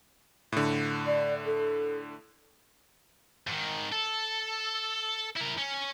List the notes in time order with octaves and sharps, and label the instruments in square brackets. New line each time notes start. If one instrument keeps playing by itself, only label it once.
[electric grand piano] A2 D3
[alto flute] D5
A4
[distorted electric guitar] G#2 D#3
A4
E4 A#4
C#4